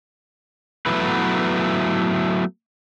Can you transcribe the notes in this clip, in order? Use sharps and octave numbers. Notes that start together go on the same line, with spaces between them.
F#3 A3 B3 E4 B4